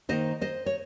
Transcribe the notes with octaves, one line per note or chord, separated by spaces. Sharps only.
D#3 A#3 D#4 C5 D#5
C5 D#5
C#5